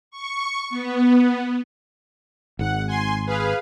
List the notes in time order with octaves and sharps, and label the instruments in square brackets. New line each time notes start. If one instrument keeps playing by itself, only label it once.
[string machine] C#6
B3
[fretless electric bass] G#1 G#2 [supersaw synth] F#5
[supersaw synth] G#5 C6
G#4 B4 F5